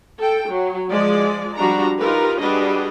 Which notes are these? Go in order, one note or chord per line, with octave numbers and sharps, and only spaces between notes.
A4 G5
F#3
F3 G#3 D5
F3 G3 D4 F#4 A#5
D#4 F4 G4 A#4 B4
G3 D4 F#4 G#4 B4 D#5